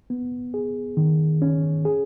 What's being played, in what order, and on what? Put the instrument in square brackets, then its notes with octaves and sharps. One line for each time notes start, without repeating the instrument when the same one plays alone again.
[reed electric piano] B3
G#4
D#3
C#4
G#4